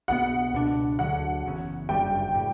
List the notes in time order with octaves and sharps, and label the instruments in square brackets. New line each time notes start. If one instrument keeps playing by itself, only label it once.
[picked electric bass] B1 B2 F#3 B3 [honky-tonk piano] F#5
[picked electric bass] C#2 B2 G3 D4
[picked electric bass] D2 D3 F#3 [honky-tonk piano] F#5
[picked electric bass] F#1 E2 C#3
[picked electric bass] G1 F#2 C#3 G3 [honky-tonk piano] G5
[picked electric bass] A2 G3